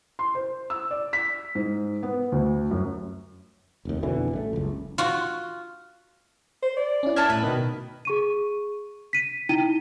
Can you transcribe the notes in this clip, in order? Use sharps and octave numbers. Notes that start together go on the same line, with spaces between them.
C6
C5
E6
D5
B6
G#2
B3
D2
F#2
F1 D#2
F2 B2 D3 E3
A1 G3 A3
F#1 C#2
F4 F#4
C5
D5
C#4 E4
A#4 E5 A5 G#6
A2 B4
B2 D#3 B3
G#4 C#6 D#7
B6 D#7
D#4 E4 G5 D#7